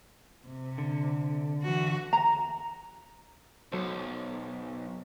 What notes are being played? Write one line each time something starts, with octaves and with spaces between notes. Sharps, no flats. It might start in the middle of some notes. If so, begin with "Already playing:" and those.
C3
D3
E3 F#4
A#5
B1 F#3 A4 C5